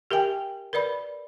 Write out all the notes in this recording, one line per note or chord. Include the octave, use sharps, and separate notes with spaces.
G4 A#4 E5 G5 G#5
A#4 B4 D5 B5